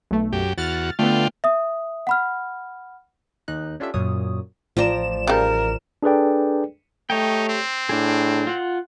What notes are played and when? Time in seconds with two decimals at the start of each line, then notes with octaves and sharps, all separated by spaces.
0.11 B1 A3
0.33 F#2 G4
0.58 E2 F#4 F6 A6
0.99 D3 A3 B3 F4 G5
1.44 E5 D#6
2.07 F#5 B5 F6
3.48 D#2 D#4 F#6
3.80 C#4 D4 F4 G4 A4 E5
3.94 F#2 A#2 F#3 C#5 D#6
4.77 A1 F3 D5 G5 A#5 E7
5.27 C#3 G3 A#4 A5
6.03 D4 G#4 A4 B4 D5 G5
7.10 A3 D#4 G4 C#5 G5
7.49 C4
7.89 A2 D4 G#4
8.47 F4 F#5